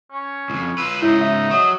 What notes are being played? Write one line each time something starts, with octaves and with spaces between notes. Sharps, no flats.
C#4
C2 F2
F4 B4 E6
G#2 C#3 D#4 E4
E5
F#3 D#5